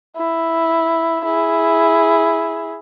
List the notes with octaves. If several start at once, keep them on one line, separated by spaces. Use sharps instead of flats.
E4
E4 G#4